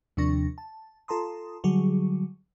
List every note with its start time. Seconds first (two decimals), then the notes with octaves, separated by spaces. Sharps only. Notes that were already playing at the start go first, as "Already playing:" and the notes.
0.17 D#2 C3 F3 D4 C#6 A#6
0.58 A5
1.08 F4 A4 A5 A#5 C6 D#6
1.64 D3 F#3 G3 F#4 G#4